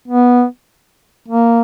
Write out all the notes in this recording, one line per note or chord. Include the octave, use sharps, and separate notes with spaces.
B3
A#3